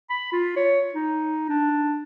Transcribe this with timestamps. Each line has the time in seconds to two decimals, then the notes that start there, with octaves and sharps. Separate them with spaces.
0.10 B5
0.32 F4
0.56 C#5
0.94 D#4
1.49 D4